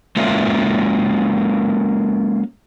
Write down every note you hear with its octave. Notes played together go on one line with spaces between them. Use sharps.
G#3 A#3 C#4 F4 E5